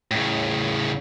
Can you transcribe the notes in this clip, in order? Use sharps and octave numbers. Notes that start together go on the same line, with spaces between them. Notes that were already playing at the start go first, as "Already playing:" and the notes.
A2 C#3